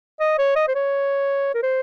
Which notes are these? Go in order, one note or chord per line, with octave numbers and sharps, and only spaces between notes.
D#5
C#5
D#5
C5
C#5
A#4
C5